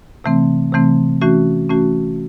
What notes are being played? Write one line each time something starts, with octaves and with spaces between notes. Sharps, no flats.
C3 E3 A3 C4
C3 E3 A3 C4
E3 A3 C#4 F#4
E3 A3 C#4 F#4